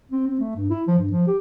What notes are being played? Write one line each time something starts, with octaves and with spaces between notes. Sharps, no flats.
C4
C4
A3
G2
E4
F3
G2
F3
G4